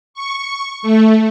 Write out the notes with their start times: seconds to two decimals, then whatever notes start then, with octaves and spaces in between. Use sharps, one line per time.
0.14 C#6
0.83 A3